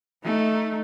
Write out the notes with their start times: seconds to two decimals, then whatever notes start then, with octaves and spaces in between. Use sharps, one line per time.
0.25 A3 D#4